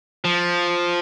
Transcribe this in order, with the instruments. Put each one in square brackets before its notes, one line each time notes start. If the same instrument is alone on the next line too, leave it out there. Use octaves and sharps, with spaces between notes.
[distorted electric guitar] F3